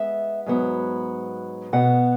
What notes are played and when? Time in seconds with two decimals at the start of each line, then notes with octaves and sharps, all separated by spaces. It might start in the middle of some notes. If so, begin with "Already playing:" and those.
Already playing: G#3 B3 E5
0.46 G#2 F#3 B3
1.73 B2 B3 F#5